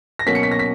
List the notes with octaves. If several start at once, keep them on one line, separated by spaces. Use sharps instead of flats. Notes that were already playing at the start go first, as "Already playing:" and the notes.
A#6
B2 F#3 A#3 C#4 B6
C#7
B6
A#6
B6